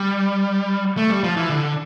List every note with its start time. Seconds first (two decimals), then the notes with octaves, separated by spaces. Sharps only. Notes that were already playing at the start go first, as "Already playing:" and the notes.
Already playing: G3
0.97 A3
1.10 G3
1.24 F3
1.37 E3
1.50 D3